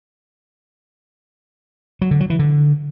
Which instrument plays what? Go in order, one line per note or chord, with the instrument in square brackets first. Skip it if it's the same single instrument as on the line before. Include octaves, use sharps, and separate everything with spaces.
[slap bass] F#3
D3
F#3
E3
D3